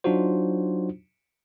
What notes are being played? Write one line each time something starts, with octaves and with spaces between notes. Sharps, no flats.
F#3 D4 D#4 F4 F#4 C5